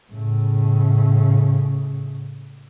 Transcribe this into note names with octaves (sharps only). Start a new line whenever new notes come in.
A2 C#3